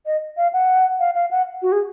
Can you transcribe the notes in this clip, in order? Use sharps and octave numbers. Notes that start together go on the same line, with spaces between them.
D#5
F5
F#5
F5
F5
F#5
F#4
G#4